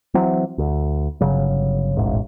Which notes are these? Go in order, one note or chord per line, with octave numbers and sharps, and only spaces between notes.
E3 F#3 C4
D2
G1 C#3 F#3
E1 A1 G#2